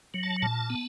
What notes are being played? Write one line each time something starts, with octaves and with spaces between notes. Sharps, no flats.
F#3
A5
A#2 A5
B3